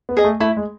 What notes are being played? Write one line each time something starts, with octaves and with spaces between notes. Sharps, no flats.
B3
G#4 D#5
A3
A3 E4
G#3